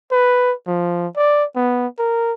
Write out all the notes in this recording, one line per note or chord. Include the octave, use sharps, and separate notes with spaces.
B4
F3
D5
B3
A#4